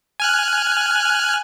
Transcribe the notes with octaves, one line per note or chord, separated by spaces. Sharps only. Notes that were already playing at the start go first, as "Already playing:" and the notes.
G#5 F6 F#6